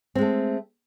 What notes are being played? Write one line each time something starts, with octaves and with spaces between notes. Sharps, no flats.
G#3 A3 C4